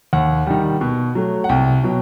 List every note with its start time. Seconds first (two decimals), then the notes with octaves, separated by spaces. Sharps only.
0.13 D#2 F#5
0.47 D#3 G3
0.81 B2
1.15 F#3 A3
1.44 F#5
1.49 C2 G5
1.84 B2 F#3